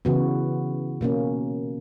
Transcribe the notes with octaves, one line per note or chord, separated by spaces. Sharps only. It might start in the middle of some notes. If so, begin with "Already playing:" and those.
C#3 E3 B3 F#4
B2 A#3 C#4